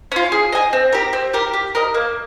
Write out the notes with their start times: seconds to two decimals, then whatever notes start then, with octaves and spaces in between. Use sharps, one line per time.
0.12 C#4 F4
0.32 G#4
0.52 D#5 G#5
0.73 C4
0.92 G4 A#4
1.13 C4
1.33 G4 A#4
1.53 G4
1.75 A#4 D#5
1.94 A#3